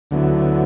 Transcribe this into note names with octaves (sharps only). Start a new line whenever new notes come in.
D2 D3 F#3 B3 E4